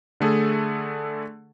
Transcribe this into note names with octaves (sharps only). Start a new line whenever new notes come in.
D3 A3 G#4 A4